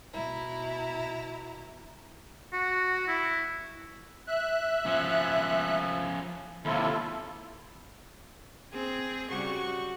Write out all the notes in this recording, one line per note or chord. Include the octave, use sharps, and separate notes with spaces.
B2 E4 A#5
F#4
E4
E5 F#6
F3 C#4
D#2 C3 E4 F4 A4
C4 G#4
C#3 G3 F#4 G4 C#6